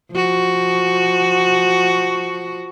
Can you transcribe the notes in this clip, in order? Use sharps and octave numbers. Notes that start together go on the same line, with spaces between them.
F3 F#4